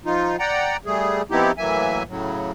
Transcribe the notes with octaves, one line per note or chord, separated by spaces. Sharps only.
F3 D#4 F4
D5 F#5 G5 A#5
G3 A3 G#4
F3 B3 C4 D#4 E4 G4
A2 E3 F#3 A#3 E5 G#5
A2 C#3 F#3